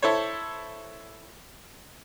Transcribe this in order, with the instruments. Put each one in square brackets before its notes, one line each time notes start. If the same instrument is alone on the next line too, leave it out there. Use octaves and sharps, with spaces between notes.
[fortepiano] E4 A4 C5 C#5